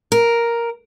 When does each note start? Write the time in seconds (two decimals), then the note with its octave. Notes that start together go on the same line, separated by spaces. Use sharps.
0.12 A#4